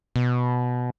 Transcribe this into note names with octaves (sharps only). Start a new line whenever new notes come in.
B2